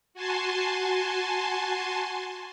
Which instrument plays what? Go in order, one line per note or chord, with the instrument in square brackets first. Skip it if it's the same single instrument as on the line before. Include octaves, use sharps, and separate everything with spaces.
[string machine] F#4 G#5 A5 C6